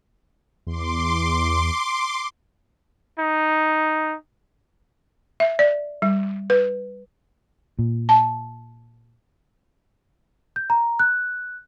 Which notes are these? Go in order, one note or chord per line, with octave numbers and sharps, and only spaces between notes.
E2 C6 D6
D#4
E5
D5
G3
B4
A#2
A5
G6
A#5
F#6